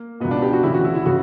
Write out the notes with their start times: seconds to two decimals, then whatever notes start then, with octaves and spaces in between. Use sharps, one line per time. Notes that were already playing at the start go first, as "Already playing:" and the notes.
Already playing: A#3
0.20 C#2 B2 B3
0.31 D4
0.42 G4
0.53 F#4
0.63 D2 C#3 E3 E4
0.74 F#4
0.84 E4
0.95 E4
1.06 C#3 F#4